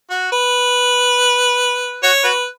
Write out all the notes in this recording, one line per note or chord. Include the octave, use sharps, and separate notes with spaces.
F#4
B4
F#4 C#5
F#4 B4